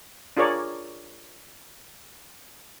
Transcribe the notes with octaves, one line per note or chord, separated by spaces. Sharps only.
D4 F4 G#4 A#4 C#5 D5